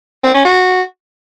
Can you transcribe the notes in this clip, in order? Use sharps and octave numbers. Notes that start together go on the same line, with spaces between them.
C4
C#4
F#4